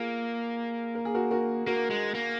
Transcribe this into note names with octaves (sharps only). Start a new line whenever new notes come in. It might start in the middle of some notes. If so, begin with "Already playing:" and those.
Already playing: A#3 F4 G#4
A#4
G#4
F#4 A#4
F#4 A#4
A#3 F#4 A#4
G#3
A#3